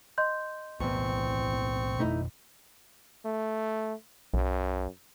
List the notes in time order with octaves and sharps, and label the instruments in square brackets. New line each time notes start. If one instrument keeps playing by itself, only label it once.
[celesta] D#5 C6 G6
[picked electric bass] B1 A2 B3 [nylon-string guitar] E2 [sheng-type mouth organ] C4 C#6
[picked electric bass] F2 B2 [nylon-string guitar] A3 D#4 E4
[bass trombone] A3
[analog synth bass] B1 [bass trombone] F#2